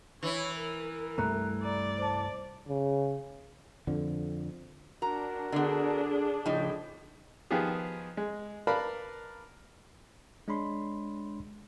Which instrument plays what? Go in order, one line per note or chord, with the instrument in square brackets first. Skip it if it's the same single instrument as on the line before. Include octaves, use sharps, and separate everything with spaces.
[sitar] E3 E4 [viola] C#5
[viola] A#4
[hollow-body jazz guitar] C2 G2 A3 [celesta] A#5 F#6
[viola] D5 [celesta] A#5
[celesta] C5 A5
[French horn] C#3
[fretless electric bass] F2 D3
[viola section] D4 [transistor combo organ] F#4 A#4 [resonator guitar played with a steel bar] A#5
[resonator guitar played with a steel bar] D3 B3 [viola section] D4 G#4
[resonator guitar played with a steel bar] A2 D#4 [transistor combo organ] C#3 F3 G5
[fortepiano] D#3 F3 B3 F4 G4 G#4
G#3
A#4 B4 D5 F5 A5 B5
[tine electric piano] G#3 D4 C#5 B5 C6